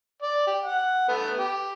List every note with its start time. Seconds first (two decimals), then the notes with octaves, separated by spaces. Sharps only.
0.22 D5
0.47 G4
0.64 F#5
1.09 A3 B3
1.39 G4